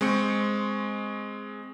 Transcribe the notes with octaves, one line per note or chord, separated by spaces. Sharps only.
G#3 C4 C#6 C#7